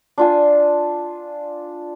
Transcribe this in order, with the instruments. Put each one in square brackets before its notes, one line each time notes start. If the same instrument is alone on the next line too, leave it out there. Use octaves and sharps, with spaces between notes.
[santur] D4 F4 G#5